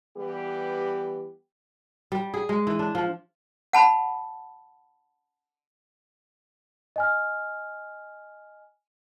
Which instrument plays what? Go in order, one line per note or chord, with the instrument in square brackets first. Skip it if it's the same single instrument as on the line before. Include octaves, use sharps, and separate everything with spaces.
[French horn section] E3 G3 B3 G4
[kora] G3
G#4
G#3
E3
D4
F3
[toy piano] F#5 A5 B5
[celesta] D#5 G#5 F6